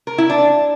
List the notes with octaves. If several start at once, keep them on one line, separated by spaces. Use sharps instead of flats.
A#4
E4
D4